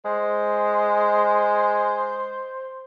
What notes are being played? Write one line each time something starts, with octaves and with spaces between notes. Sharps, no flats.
G#3 C5